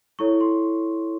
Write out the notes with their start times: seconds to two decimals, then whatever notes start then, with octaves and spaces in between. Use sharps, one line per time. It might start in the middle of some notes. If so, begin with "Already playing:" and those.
0.19 E4 A4 C#5 C#6
0.41 C6